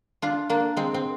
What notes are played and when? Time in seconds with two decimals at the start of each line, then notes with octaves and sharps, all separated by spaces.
0.22 D4 F4
0.50 A#3 D4
0.77 G#3 C4
0.94 C4